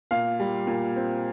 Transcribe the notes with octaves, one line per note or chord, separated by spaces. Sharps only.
A#2 F5
G3
A#2
C4